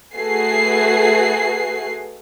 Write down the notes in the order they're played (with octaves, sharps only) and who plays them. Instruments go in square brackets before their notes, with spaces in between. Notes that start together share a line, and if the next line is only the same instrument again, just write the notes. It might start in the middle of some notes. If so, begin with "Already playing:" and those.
[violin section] A3 F#4 G#4 B4 C7